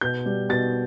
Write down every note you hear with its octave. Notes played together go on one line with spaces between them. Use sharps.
B2 G6
G3
B2 A6